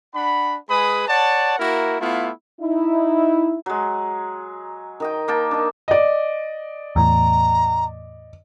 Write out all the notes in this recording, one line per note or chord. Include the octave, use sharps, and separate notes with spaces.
D4 F#5 B5
G#3 G#4 B4 B5 D#6
C#5 D5 F#5 A5
A#3 E4 F#4 A#4
A3 B3 E4 F4 F5
D#4 E4
F#3 G#3
D#3 D#5 G5
A#3 G5 A5
D4 D#5
D5 D#5
E2 A2 A#5